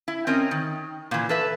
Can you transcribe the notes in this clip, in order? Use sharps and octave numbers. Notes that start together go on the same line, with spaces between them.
E4
C4 C#4 A#4 D#5
D#3
A#2 E3
A4 B4 E5